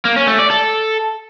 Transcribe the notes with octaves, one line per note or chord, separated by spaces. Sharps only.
A#3
C#4
A3
D5
A4